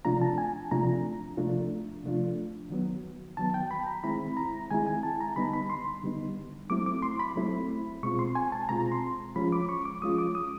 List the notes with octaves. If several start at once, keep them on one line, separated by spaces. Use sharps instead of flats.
C3 F3 A3 D4 F4 A#5
A5
G#5
C3 F3 A3 D4 F4 A#5
C3 F3 A3 D4 F4
C3 F3 A3 D4 F4
D#3 F#3 B3
D#3 F#3 B3 A5
G5
B5
A#5
D#3 G#3 C4 E4 B5
A#5
D#3 G#3 C4 E4 G#5
G#5
A5
A#5
D3 G3 B3 D#4 B5
B5
C6
D3 G3 B3 D#4
F#3 A3 C4 E4 D6
D6
C6
B5
F#3 A3 C4 E4
B2 G#3 C4 F4 C#6
C6
G#5
A5
B2 G#3 C4 F4 A#5
C6
F3 G#3 C#4 F4 B5
D6
C#6
D6
F3 G#3 C#4 F4 D#6
D6
D#6